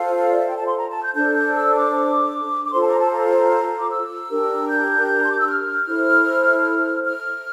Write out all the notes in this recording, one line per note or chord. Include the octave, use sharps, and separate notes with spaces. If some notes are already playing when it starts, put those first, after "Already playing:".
Already playing: F4 A4 C5 F5
D5
E5
G5
A5
C6
A#5
A5
G6
D4 A4 C5 G6
G6
E6
D6
D6
F4 A4 C5 C6
A5
A#5
A5
A#5
D6
E6
D4 G4 A#4
G6
A#5
C6
D6
E6
F6
E4 A4 C5
F6